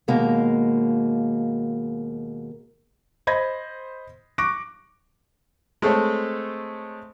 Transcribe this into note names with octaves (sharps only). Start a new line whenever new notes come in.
D#2 B2 G#3 A#3
C5 D#5 B5 G#6 A#6
C#6 D6 F#6 A#6 D7
G#3 A3 C4 A4 C#5